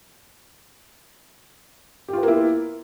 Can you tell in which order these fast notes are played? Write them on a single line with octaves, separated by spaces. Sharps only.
G4 F4 B3 A#3 E4